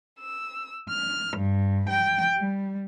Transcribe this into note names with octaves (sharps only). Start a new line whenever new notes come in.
E6
F6
G2
G5
G3